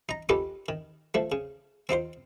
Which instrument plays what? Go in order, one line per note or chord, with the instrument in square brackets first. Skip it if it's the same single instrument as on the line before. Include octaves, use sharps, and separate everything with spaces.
[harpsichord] D#4 A#5
C#4 D#4 F4 G4 A4 B4
D#3
F3 A3
C#3
C4 D#4 F4 C5